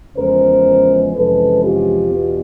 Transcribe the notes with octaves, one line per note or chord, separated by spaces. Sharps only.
E2 C#3 F3 G#3 C#4 A#4 C5
F2 C3 E3 G#3 C#4 A4 B4
F4 G4
E2 B2